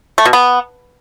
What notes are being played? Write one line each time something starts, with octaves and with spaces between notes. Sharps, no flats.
A3
B2
B3